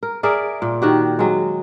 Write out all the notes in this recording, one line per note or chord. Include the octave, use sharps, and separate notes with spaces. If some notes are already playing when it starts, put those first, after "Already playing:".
A#4
G#4 A#4 D5 E5
A#2
D#3 F#4 G4
F#3 G#3